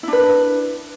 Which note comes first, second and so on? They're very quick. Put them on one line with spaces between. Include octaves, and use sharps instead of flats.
E4 D4 B4